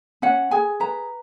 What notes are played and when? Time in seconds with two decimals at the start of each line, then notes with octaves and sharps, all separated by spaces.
0.22 C#4 F#5
0.51 G#4 G#5
0.80 B4 A#5